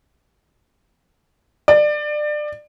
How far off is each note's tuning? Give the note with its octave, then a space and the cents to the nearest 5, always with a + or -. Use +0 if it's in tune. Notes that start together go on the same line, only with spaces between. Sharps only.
D5 +25